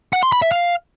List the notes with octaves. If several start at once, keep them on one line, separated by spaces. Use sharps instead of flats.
F#5
C6
B5
E5
F5